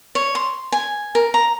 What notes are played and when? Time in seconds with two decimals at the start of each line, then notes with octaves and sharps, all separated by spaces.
0.15 C#5
0.35 C6
0.72 G#5
1.15 A#4
1.34 A#5